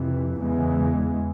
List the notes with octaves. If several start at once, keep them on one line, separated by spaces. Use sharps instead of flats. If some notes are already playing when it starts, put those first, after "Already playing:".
Already playing: F2 C3 E3
E2 C#3 E3 G#3